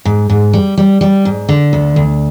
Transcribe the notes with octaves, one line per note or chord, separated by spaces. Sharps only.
G#2
G#2
G3
G3
G3
G#2
D3
D2
D2